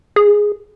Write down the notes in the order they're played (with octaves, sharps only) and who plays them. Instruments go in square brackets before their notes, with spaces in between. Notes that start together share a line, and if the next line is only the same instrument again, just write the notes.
[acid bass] G#4